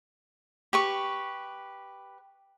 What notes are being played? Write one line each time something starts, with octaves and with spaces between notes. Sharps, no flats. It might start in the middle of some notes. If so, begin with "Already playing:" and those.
G4 B4 C#6